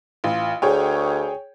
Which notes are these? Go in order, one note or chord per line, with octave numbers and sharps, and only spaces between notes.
A1 F4
D2 G#4 C#5 G5